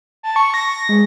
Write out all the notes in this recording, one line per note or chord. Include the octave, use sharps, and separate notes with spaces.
A5
C#6
A#6
G#3